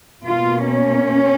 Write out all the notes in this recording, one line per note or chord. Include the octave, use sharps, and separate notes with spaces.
B2 A#3 F4
C#4